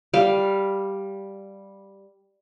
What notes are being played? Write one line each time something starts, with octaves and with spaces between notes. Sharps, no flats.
G3 F5